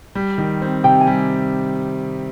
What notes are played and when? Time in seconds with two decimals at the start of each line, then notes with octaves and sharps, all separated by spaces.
0.15 G3
0.38 D#3
0.62 C4
0.84 C3 G5
1.01 G#5
1.07 G3